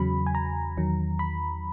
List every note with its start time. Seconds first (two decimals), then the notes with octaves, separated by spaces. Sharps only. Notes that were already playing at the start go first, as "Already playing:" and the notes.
Already playing: E2 C#3 F#3 B5
0.26 G#5
0.35 A#5
0.77 E2 D#3 F#3
1.19 B5